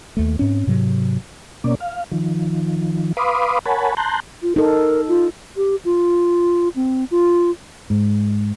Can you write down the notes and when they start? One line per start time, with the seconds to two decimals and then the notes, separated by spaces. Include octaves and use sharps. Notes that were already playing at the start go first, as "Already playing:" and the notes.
0.17 D#2 A3
0.39 G#2 C4 C#4
0.67 G#2 C3 F#3
1.64 B2 A#3 C#4 D5
1.80 F5
2.12 D#3 F3
3.17 B4 F5 B5 C6 D6 D#6
3.66 A#4 C#5 F#5 G#5 A5 B5
3.97 A5 A#5 C6 F#6 G6
4.42 F4
4.56 D#4 A4 A#4
5.08 F4
5.57 G4
5.85 F4
6.76 C4
7.11 F4
7.90 G#2